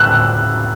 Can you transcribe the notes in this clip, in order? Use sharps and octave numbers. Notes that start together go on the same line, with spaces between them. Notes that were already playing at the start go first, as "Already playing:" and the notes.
Already playing: E6 F#6